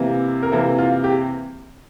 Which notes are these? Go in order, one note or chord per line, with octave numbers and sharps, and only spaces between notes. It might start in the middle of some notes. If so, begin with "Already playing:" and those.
Already playing: C3 E3 A#3
A#4
C3 E3 A#3 A4
F4
G4